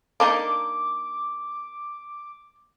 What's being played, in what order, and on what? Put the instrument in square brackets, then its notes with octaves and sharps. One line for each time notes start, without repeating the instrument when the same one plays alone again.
[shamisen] A#3 D4 D#4 [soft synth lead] D6